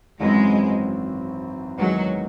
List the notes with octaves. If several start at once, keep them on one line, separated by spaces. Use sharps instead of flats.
G#1 F#2 E3 G#3 C4 E4
E2 D#3 F#3 G#3 D#4